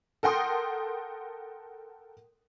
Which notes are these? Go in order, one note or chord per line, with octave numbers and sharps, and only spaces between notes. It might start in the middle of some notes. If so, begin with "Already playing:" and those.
A4 A#4 F#5 G5 C6 D#6